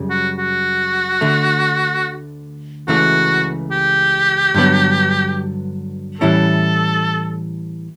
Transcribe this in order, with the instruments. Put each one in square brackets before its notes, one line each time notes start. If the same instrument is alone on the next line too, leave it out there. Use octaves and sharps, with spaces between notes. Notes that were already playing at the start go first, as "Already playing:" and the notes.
Already playing: [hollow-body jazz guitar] F#2 C#3 G3
[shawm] F#4
F#4
[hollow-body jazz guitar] D2 D3 A3
[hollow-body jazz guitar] C#2 C#3 E3 A3 [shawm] F#4
[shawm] G4
[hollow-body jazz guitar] G2 D3 F#3 B3
[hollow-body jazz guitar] A2 E3 G3 C#4 E4 [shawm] A4